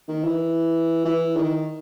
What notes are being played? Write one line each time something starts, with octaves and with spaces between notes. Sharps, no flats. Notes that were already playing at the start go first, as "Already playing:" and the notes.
D#3
E3
E3
D#3